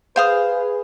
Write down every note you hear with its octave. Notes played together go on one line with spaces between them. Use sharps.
G#4 B4 C5 F5 D#6